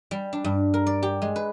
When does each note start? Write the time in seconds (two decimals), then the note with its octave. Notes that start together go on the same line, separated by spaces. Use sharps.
0.11 G3
0.33 D4
0.44 G2
0.74 A#4
0.86 D5
1.03 G4
1.22 G#3
1.36 B4